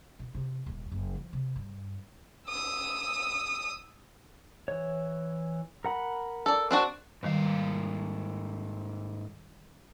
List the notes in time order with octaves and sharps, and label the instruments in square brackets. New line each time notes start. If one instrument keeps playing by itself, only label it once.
[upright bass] B2
C3
D#1
F#1
F3
C3
G2
[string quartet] D#6 E6
[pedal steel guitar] E3 C#5
A#4 F#5 B5
[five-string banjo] A4 D5
C4 D4 F#4
[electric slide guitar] G#2 A#3 F5 [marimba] D#3 G3 B4